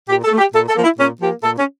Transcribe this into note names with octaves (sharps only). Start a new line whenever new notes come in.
A#2 G4
A4
A3
G4
A#2 A4
A4
F3 A#3
E4
A#2 C#4
F3 A#3 G4
A#2 A4
C#4